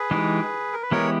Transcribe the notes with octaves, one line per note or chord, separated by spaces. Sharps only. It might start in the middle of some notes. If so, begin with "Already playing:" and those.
Already playing: G#4 B4
E3 G#3 D#4 G4
A#4
B4
E3 G#3 B3 E4 G4 A#4 C#5